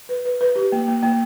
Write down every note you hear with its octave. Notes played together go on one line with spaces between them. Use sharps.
B4
B4
B4
G4
A#3
A#3
A#3